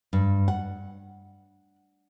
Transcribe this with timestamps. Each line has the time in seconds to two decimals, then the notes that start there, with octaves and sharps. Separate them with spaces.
0.13 G2
0.48 F#5